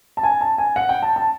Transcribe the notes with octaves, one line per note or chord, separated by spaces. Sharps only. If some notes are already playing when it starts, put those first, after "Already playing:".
A5
G#5
A5
G#5
F#5
G5
A5
A5